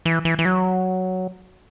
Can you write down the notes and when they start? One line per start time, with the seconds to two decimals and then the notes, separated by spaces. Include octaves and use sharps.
0.05 E3
0.25 E3
0.39 E3
0.45 F#3